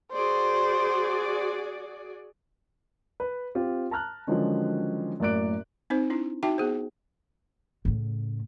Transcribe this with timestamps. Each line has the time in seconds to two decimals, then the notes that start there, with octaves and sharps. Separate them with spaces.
0.13 F#4 G#4 C5 D5
3.20 B4
3.55 C4 F4 G4
3.91 A5 A#5 F6 F#6
4.27 D3 D#3 F3 F#3 G#3 C#4
5.20 F#2 A2 A#3 D5 F#6 D7
5.90 C4 D#4 C5
6.10 D4 E4
6.43 D#4 F#4 E5 G5 A5
6.58 B3 G#4 C5
7.85 A2 C#3